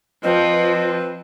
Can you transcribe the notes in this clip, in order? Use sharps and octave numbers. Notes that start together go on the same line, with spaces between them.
F3 C4 B4 D#5